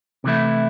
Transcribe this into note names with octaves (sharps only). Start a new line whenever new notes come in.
C3 E3 A3 E4